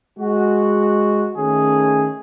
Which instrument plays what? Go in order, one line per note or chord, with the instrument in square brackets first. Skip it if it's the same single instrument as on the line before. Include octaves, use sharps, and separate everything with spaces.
[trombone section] G#3 F#4
D#3 A3 C#4 G#4